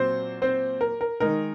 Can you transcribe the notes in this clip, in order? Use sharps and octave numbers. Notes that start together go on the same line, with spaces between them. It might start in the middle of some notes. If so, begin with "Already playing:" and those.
Already playing: A#2 F#3 C4 C5
C4 C5
A#4
A#4
D#3 G#3 D#4 A#4